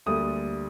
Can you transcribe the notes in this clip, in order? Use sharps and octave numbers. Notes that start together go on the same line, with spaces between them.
D2 D3 G3 A#3 D#6